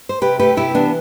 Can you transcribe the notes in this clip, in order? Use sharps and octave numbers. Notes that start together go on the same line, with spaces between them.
C5
C3 G4 B4
A3 G4 B4
C3 E4 G4
E3 B3 D4